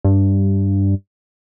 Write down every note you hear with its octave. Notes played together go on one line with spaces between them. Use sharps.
G2